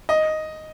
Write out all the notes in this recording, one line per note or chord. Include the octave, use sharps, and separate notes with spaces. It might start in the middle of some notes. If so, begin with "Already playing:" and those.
D#5